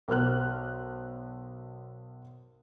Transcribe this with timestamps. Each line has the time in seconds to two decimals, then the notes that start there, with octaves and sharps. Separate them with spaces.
0.08 B1 A#4 C5 F6 F#6